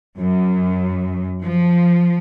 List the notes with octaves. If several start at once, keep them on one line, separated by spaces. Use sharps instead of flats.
F#2
F3